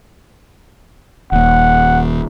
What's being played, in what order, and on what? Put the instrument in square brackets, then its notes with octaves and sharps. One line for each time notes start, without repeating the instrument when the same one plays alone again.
[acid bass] D#1 [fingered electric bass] D#2 A#2 [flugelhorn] F#5